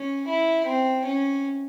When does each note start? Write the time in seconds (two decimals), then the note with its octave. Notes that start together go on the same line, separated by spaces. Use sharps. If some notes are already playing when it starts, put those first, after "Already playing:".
Already playing: C#4
0.28 E4
0.66 C4
1.05 C#4